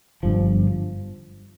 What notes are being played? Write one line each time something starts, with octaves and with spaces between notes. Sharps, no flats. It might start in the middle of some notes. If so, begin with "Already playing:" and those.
G1 G2 F3